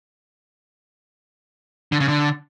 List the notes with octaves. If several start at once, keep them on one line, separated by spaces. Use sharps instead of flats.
D3
C#3
D3